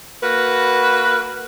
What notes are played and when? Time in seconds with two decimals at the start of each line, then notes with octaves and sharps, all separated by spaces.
0.22 A#3 F#4 B4